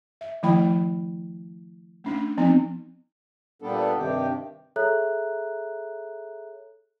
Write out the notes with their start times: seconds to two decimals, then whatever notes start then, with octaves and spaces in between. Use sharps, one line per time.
0.21 E5
0.43 D#3 F3 A3 E4 G5 B5
2.04 A3 C#4 D4
2.37 F3 B3 C4 D#4
3.62 A#2 G3 B3 D4 A4
3.96 G2 C3 D#3 G4
4.76 G#4 A4 C#5 E5 A#5 F#6